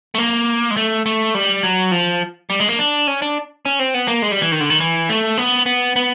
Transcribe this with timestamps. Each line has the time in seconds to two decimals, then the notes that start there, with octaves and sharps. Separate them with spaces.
0.15 A3
0.18 A#3
0.71 G#3
0.77 A3
1.06 A3
1.35 G3
1.63 F#3
1.91 F3
2.50 G3
2.60 G#3
2.69 A#3
2.79 D4
3.07 C#4
3.22 D4
3.65 C#4
3.79 C4
3.94 B3
4.08 A#3
4.22 G#3
4.31 G3
4.41 E3
4.52 D#3
4.60 D3
4.70 D#3
4.80 E3
5.09 A3
5.38 B3
5.66 B3
5.96 B3